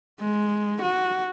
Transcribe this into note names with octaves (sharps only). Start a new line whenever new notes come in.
G#3
F#4